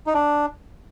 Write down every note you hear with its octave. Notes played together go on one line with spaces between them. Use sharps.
D#4
D4